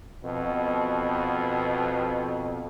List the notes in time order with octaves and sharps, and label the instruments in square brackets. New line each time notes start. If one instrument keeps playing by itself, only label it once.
[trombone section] F2 B2